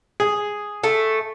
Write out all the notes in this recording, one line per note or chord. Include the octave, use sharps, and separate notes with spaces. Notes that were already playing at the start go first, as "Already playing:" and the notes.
G#4
A3